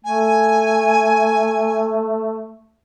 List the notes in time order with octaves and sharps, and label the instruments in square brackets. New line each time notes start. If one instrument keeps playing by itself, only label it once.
[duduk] A3 [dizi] G#5